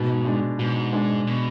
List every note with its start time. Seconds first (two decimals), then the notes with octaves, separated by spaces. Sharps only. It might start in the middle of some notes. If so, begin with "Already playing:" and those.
Already playing: G#2 B2
0.25 G#3 D4
0.59 G#2 B2
0.93 G#3 D4
1.27 B2